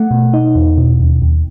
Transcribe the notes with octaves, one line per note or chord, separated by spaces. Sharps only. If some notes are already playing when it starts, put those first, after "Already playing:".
Already playing: A3 F#5
B2
D#4
E2
B2
D#2
D#2